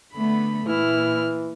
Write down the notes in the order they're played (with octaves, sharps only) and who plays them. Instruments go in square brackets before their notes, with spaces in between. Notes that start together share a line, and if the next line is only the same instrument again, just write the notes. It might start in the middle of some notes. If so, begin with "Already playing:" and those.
[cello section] D3 A3 B3 [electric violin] B5
[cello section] A#2 [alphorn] E3 [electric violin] E4 F6